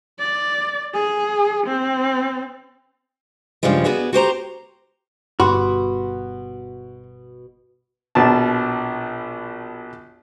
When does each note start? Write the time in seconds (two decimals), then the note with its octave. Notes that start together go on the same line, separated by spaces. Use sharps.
0.20 D5
0.94 G#4
1.66 C4
3.63 G2 C#3 F3 G3 G#3
3.84 B3 F#4 G#4 D5
4.13 F#4 G4 C5 A#5
5.40 G1 G2 B2 F#4 G4 B5 C6 D6
8.15 A#1 B2 A5